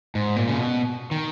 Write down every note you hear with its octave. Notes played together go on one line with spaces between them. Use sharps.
G#2
A#2
C#3
B2
D#3